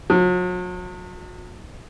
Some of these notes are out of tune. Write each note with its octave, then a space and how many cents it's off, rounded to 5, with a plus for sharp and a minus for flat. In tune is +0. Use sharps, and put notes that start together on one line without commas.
F#3 -40